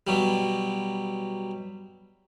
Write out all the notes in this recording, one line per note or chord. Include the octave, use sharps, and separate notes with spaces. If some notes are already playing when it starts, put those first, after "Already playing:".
B2 F#3 G3